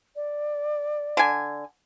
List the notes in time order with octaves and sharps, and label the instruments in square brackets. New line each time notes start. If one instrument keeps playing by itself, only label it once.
[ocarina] D5
[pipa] D3 G#5